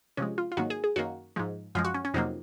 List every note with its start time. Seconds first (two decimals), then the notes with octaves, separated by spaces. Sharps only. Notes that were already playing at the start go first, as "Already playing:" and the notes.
0.17 C3 F3 G#3 C#4
0.38 F4
0.52 F4
0.57 G#2 D#3 F#3 A#3 F#4
0.70 G#4
0.84 G#4
0.96 F#2 D#3 A#3 F#4
1.36 G#2 F3 G#3
1.75 F#2 F3 G#3 F4
1.85 F#4
1.94 C#4
2.05 C#4
2.14 F2 C3 F#3 A#3 D#4